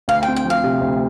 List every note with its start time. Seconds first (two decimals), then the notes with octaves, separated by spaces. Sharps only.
0.08 D2 F5
0.23 C4 G5
0.36 G5
0.45 F3 F5
0.64 C3
0.81 D2